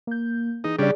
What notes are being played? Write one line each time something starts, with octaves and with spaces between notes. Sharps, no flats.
A#3 G6
E3 D#4 G#4
C#3 G3 D4 G#4 D5